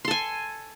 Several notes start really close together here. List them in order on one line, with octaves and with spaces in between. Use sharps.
C6 A4 G#5